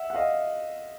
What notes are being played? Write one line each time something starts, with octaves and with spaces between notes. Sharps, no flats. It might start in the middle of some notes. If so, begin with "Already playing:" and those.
Already playing: E5 F#5
F#5
D#5 F5